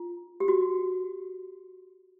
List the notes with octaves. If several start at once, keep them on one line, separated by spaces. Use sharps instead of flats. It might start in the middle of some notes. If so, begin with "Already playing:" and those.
Already playing: F4
G4
F#4